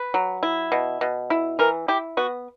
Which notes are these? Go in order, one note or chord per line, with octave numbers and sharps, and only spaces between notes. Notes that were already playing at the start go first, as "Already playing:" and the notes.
Already playing: B4
F#3
E4
B2
B2
E4
E3 A#4
E4 G4
B3 F#4